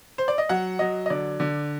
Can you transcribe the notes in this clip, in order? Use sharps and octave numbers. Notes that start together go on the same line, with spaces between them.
C5
D5
D#5
F#3 F#5
F#3 D#5
D#5
D3 D5
D3